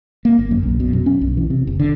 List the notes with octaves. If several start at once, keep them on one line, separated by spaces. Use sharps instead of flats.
A#3
G1
F#2
B1
B2
F#2
C#4
B1
E3
C3
F#1
D3